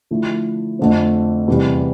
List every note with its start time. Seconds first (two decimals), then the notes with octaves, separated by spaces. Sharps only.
0.11 D3 F3 A3 E4
0.79 F2 D3 A3 C4
1.48 E2 C3 E3 G3